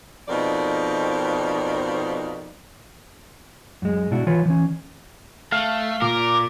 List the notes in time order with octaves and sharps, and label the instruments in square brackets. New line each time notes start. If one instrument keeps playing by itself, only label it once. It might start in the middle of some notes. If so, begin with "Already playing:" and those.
[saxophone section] F2 B2 D#4 A#4 C5 D5
[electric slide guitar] F#2 G#3
B2 D4 E4 F#4
E3 F4 B4 C#5
E3 C#4
[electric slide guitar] A3 [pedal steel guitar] F5
[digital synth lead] A#2 [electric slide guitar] A#4 [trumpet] D6